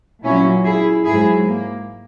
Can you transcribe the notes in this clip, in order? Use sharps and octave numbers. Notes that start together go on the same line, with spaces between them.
A#2 F#3 C#4 E4
E4 G#4
G#2 F#3 E4 G#4
A#3